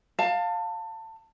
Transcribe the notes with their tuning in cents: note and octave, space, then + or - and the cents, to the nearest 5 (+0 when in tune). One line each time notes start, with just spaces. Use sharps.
F5 +15 A5 +25